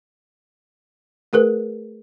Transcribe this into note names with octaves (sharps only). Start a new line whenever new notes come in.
A3 G#4 A#4 B4